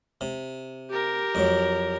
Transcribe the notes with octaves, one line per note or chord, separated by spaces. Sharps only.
C3
G4 A#4
F2 F#3